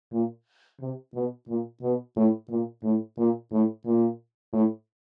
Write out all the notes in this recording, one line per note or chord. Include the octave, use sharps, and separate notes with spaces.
A#2
C3
B2
A#2
B2
A2
A#2
A2
A#2
A2
A#2
A2